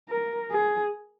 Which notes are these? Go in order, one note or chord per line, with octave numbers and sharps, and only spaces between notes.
A#4
G#4